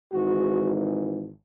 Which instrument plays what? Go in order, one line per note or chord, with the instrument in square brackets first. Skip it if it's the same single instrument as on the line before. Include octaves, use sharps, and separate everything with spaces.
[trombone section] G#1 G#2 E3 F#4